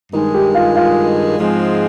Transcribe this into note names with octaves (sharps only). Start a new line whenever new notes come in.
G2 D#3 G#3 D#4
G4
F4
F4
G#2 F3 G#3 C4